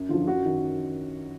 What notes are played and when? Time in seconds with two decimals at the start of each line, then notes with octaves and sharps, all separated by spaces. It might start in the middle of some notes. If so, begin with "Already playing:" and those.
Already playing: F#2
0.09 D3 F4
0.14 F3
0.27 F#2 F#4
0.45 D#3